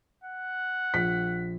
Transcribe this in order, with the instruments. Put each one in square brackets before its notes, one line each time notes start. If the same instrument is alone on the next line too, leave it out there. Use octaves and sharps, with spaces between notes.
[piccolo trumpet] F#5
[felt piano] A#1 B6